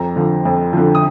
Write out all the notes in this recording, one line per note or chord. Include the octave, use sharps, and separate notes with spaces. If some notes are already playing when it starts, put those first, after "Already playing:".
Already playing: F2 A#5
D3 F3
F2
D3 F3
D#6